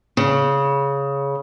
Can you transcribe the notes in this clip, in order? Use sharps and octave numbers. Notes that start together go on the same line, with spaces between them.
C#3